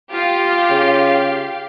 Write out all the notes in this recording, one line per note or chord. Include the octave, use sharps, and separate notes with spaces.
F4 G4 F5
C#3